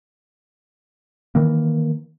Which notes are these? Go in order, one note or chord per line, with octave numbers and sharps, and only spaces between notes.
D#3 E3 A#3